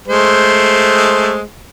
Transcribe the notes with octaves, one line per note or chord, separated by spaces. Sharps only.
G#3 A3 C5